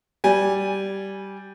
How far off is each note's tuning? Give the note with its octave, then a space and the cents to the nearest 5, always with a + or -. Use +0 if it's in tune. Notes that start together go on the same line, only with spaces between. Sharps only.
G3 -10 G#5 -15